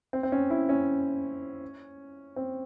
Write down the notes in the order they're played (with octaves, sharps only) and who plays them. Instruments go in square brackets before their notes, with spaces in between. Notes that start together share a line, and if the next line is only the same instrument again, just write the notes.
[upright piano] C4
C4
C#4
E4
C#4
C4